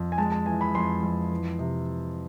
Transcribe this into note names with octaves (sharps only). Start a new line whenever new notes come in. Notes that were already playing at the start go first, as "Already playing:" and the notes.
Already playing: F2
G#5
G#3 A5
A5
E3 G#5
B5
F2 C6
F2
E3
C3